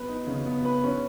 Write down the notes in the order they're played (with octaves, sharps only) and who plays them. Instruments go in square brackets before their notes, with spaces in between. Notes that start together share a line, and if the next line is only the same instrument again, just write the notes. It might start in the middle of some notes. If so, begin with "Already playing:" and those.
Already playing: [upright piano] B3 B4
D#4
C#3
B3
B4
C#4